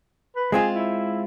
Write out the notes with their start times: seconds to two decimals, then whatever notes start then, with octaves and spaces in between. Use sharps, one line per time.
0.36 B4
0.52 G#3 C4 F4 G#4
0.75 E4